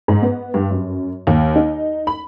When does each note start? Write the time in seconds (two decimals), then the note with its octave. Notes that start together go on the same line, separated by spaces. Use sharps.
0.08 G#2
0.22 B3
0.54 G2
0.71 F#2
1.27 D#2
1.56 D#4
2.07 B5